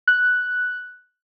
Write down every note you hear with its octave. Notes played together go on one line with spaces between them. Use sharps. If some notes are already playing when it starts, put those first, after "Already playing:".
F#6